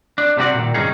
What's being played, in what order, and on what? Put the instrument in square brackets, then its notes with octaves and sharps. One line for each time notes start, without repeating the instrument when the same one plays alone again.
[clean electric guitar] D4
C3 G3 F#4 D5
A#2 D#3
C2 G2 D#3 C#4 D#4 G#4